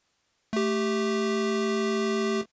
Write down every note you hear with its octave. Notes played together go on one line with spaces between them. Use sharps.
A3 G4